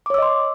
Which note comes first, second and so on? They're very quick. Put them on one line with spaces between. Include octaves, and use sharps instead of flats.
D6 C#5 E6 D#5 C6